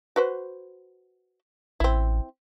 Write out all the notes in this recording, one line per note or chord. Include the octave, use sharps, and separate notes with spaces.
F#4 B4 C5
A1 C4 E4